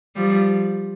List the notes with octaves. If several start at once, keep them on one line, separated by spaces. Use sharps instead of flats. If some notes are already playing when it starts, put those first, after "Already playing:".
F3 G3